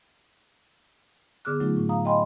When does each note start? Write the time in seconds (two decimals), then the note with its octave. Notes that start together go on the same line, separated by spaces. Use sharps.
1.45 D3 B3 G#4 D6 F6 F#6
1.60 D3 F#3 A3 D#4 F4
1.76 A2
1.89 F5 A#5 D#6
2.05 D#5 F5 G5 G#5 B5 C6